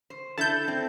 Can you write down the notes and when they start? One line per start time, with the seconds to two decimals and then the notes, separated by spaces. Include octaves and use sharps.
0.10 C5
0.38 D4 E4 A4 A5 G6
0.68 C4